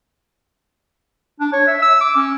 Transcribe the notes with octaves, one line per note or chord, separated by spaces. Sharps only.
D4
C#5
E5
E6
D6
C#4